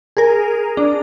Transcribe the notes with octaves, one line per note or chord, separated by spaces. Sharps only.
G#4 A#4
D4